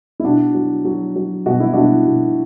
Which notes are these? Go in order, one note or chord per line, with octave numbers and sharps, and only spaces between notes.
E4
B2 D4 F#4
F#3
F#3
F#3
B2 F#4
E4
B2 D4 F#4
B2